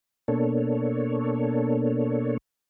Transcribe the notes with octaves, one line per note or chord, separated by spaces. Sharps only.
B2 A#3 D4 A4 C#5